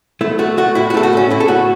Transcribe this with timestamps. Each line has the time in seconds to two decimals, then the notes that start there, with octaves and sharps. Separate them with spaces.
0.21 A3 E4
0.39 A3 F#4
0.57 A3 F#4
0.75 A2 E4
0.90 F#4
0.94 A3 A4
1.03 F#4
1.13 A3 C#4
1.30 A2 E4
1.40 A4
1.48 A3 F#4